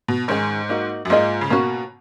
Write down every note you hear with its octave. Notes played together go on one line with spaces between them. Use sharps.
B2
G#2 D#3 G#3 C#4 F4 G#4
A#3 D#4 F#4
F#2
G#2 A#3 F4 G#4 D#5
C#3
B2 A#3 C#4 F#4